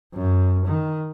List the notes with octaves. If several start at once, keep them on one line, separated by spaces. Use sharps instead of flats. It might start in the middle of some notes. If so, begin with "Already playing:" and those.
F#2
D#3